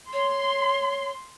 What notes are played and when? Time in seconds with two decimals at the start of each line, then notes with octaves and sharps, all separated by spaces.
0.13 C#5 C6